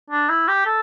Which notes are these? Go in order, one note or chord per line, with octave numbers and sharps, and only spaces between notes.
D4
E4
G4
A4